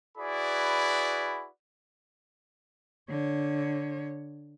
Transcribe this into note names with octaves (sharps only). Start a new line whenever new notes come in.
E4 F#4 G#4 B4 D5 B5
D3 C#5